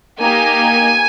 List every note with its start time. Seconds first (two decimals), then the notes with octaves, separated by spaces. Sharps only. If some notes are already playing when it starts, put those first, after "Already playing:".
0.20 A#3 D#4 G4 G#5